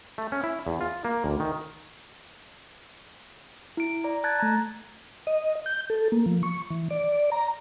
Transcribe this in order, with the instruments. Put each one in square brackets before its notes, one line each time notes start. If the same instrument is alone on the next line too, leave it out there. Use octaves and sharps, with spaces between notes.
[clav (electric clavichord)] A3
C#4
E4
E2
F4
A#3
D2
D#3
[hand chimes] E4 D7
D5 A#5
A5 F#6 G#6 A6
A3 A#5
[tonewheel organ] D#5
G6
A4
A#3
F3
C#6
E3
D5
A#5